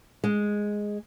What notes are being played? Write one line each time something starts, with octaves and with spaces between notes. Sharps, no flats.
G#3